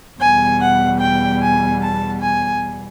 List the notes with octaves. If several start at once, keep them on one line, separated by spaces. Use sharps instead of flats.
E2 B2 G3 G#5
F#5
G5
G#5
A5
G#5